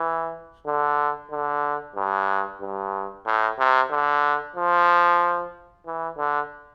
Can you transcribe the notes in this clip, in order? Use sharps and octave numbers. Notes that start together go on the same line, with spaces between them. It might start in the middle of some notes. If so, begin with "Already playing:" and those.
Already playing: E3
D3
D3
G2
G2
A2
C3
D3
F3
E3
D3